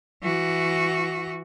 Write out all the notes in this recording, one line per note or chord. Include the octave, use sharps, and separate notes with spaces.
E3 F#4